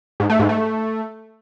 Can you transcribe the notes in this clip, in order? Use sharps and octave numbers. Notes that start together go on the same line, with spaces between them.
G#2
A3
G#2
A3